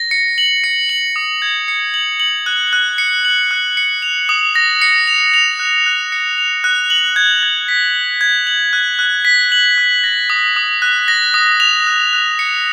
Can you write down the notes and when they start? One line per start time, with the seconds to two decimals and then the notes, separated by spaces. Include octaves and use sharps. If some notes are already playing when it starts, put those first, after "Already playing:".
Already playing: A#6
0.11 C#7
0.38 F#7
0.64 C#7
0.89 F#7
1.16 D#6
1.42 G#6
1.68 C#7
1.94 F#7
2.20 F#7
2.46 F#6
2.73 F#6
2.98 C#7
3.25 F#7
3.51 F#6
3.77 C#7
4.02 F7
4.29 D#6
4.55 A#6
4.82 C#7
5.07 F7
5.34 F7
5.59 F#6
5.86 F#6
6.12 C#7
6.38 F7
6.64 F#6
6.90 F#7
7.16 G#6
7.43 G#6
7.68 B6
7.95 F#7
8.21 G#6
8.47 F#7
8.73 F#6
8.99 F#6
9.25 B6
9.52 F#7
9.78 F#6
10.04 A#6
10.30 D#6
10.56 D#6
10.82 F#6
11.08 A#6
11.34 D#6
11.60 F7
11.87 F#6
12.13 F#6
12.39 C#7